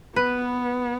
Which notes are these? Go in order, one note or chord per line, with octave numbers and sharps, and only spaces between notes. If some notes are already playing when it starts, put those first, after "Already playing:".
B3 B4